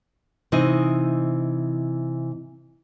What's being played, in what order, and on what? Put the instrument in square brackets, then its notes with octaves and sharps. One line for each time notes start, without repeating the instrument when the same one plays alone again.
[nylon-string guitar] C3 E3 D#4 D#5